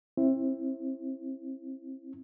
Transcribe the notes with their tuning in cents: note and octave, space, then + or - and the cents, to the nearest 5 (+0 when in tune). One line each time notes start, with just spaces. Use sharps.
C4 +30 E4 +0